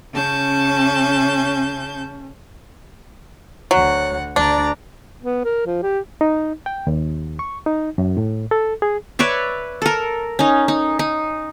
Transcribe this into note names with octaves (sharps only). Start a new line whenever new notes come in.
C#3 C#4 A5 G6
D2 F#3 F#5
D2 D4 D5 A#5
B3
A#4
F3
G4
D#4
G5
D#2
C#6
D#4
F#2
A2
A4
G#4
B4 C#5 D5 E5
A4 A#4
C#4 D#4
D#4
D#4